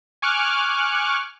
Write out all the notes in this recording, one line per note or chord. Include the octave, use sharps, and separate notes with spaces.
G#5 C#6 D6 F6 F#6